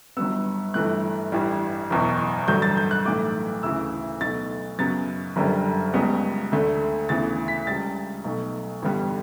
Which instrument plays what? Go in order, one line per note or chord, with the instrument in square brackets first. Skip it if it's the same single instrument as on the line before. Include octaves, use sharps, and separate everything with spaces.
[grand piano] G1 G2 F#3 B3 E6
G1 G2 E3 A3 F#6
A1 G2 E3 G3
F#1 E2 B2
A1 G2 D3 F#3 G6
A6
G6
F#6
B1 A2 E3 A3 D6
D2 C#3 E3 E6
B1 B2 A3 A6
F#2 C#3 F#3 B3 A6
F#1 F#2 D3 G3
C#2 C#3 G3 B3
D2 D3 A3
D2 C#3 E3 B3 A6
B6
C#2 C#3 G3 A6
B1 B2 A3
A1 G2 D3 G3 B3